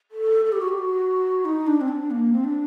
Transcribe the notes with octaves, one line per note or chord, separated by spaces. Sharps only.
A4
A4
G4
F#4
G4
F#4
D#4
D4
C4
D4
A#3
C4
D4